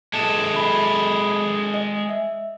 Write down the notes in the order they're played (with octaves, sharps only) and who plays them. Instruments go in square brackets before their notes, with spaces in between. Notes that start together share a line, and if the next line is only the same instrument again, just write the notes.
[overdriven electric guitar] G#3 A4 [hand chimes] A5
[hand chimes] B5
D#5
E5